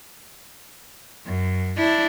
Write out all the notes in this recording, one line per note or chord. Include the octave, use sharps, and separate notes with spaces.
F#2
D4 E4